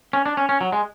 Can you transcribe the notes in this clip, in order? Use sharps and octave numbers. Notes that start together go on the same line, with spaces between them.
C#4
D4
C#4
C#4
F#3
G#3